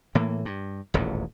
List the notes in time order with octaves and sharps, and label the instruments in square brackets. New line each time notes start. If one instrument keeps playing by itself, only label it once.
[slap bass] A2 E3 A#3
G2
D#1 A1 E2 G#2